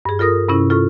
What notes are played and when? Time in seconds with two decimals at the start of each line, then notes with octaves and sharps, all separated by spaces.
0.05 G2 G#4
0.19 F4 A4 A#4 D#6 A#6
0.48 G2 C3 C#4 E4
0.70 F4 A4 C#6